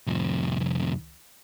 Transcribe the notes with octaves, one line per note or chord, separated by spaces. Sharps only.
C2 F2